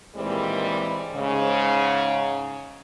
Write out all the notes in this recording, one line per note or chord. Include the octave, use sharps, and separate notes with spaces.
A#2 D#3 E3 G3 G#3 C4
G#2 C#3